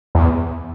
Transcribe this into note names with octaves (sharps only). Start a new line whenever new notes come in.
E2